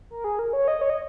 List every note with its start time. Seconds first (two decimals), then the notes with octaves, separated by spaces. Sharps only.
0.10 A#4
0.24 G#4
0.39 A#4
0.53 C#5
0.68 D#5
0.81 C#5
0.90 D#5